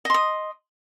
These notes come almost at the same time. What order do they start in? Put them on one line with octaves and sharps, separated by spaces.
D#5 C6 D#6